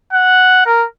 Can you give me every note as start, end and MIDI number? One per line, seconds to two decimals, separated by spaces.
0.13 0.64 78
0.66 0.85 70